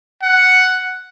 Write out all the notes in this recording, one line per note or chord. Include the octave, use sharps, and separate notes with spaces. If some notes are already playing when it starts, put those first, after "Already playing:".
F#5